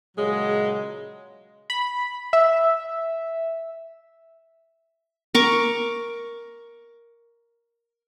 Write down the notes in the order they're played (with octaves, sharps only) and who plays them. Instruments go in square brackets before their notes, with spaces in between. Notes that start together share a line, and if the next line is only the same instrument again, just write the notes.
[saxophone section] A#2 C#3 F#3 G#3
[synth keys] B5
E5
[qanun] A#4 C#6 D6